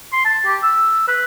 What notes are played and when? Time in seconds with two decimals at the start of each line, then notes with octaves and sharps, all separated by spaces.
0.12 C6
0.25 A5
0.46 G4
0.63 E6
1.08 B4